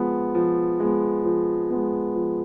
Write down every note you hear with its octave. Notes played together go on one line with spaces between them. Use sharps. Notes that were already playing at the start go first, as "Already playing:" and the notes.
Already playing: F3 G#3 B3
F3
G#3 B3
F3
G#3 B3
F3